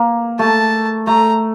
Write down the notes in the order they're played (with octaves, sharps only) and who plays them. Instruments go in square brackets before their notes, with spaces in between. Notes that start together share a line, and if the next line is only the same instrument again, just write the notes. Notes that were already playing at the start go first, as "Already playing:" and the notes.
Already playing: [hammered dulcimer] A#3
[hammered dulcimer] A3 [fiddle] A5
[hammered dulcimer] A3 [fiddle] A#5